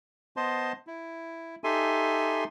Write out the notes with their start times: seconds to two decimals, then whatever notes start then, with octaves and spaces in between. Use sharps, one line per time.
0.36 B3 C5 D#5 A5 C6
0.87 E4
1.64 D#4 G4 A4 E5 G#5 C6